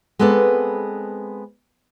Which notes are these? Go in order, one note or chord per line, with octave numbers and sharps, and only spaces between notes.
G#3 B3 C4 A4 B4 D5